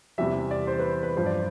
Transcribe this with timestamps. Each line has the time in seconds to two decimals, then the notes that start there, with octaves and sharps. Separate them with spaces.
0.18 E2 C3 E3 G3 E5
0.51 D5
0.67 C5
0.79 B4
1.03 B4
1.17 G2 F3 C5
1.26 D5